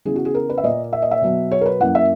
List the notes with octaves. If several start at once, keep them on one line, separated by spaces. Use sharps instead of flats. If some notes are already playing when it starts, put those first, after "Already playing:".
C#3 E3 B3 G#4
F#4
G#4
A#4
B4
E5
A#2 A#3 D#5
E5
D#5
E5
B2 F#3 B3
C#5
A#4
B4
F#2 E3 A#3 F#5
E5